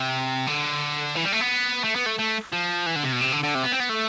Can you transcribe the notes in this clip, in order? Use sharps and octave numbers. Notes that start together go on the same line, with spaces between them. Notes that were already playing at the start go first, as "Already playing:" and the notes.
Already playing: C3
D3
E3
G3
A3
B3
A3
B3
A3
A3
F3
E3
D3
C3
B2
C3
D3
D3
C3
B3
C4
B3
A3